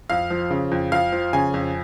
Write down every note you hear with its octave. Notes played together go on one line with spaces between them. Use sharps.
F2 F5
F3
C#3
F2
F2 F5
F3
C#3 G#5
F2